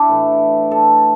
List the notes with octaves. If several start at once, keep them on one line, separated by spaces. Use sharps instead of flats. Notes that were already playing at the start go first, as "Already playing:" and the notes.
Already playing: D4 E4
A2 E3 A3
A4